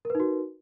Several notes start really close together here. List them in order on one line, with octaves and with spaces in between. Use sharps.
A#4 B4 D#4 F#4